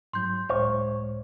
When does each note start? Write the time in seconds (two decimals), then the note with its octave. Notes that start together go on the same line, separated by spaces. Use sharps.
0.13 G#2 F#3 C6 G6
0.49 C#2 A2 G#3 C5 C#5